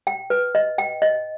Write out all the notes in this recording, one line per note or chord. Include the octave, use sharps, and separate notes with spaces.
G5
B4
D#5
G5
D#5